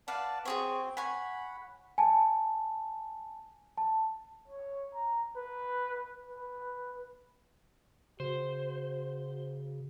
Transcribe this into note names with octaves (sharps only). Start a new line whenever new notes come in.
B4 D5 F5 F#5 A5
C4 F#4 G#4 C#5
C#5 F#5 G#5 B5
G#5 A5
A5
C#5
A#5
B4
B4
C#3 F#4 C5